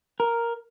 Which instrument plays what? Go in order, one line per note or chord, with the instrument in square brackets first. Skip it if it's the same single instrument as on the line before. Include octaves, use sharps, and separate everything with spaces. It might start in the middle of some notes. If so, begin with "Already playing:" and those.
[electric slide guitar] A#4